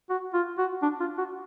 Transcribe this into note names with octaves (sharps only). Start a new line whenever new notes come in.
F#4
F4
F#4
D4
F4
F#4